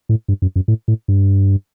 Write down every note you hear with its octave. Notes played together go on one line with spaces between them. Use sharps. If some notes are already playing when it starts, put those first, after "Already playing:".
A2
G2
F#2
F#2
A2
A2
G2